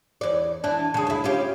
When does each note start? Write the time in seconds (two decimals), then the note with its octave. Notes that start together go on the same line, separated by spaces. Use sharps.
0.21 E2 D5
0.64 E3 D4
0.94 C#3 G#4
1.07 D2 E4
1.24 C#4 F4 G4